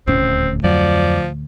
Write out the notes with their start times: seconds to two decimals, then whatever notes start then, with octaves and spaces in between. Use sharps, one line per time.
0.07 D#1 D2 A2 C4 C#4
0.64 F2 F3 F#3 D5